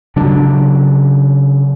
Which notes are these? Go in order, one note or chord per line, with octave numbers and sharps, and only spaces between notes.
C#3 F#3 D4